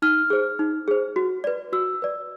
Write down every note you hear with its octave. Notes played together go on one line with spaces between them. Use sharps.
D#4 F6
G#4 C5
D#4
G#4 C5
F#4
B4 D5
F#4 E6
B4 D5